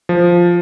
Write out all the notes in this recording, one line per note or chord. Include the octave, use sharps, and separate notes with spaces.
F3